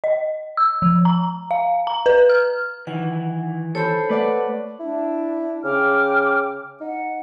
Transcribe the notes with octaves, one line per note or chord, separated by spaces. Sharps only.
D#5
E6
F3
A#5
F5
A#5
B4
F6
D#3 E3 F#5
A4 C5 C#5 B5
A3 B4 D5 F#5
D4 E4
D4
C#3 G5 D6 F6
D#4 F#5